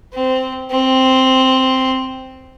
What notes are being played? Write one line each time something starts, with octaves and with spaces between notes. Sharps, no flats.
C4
C4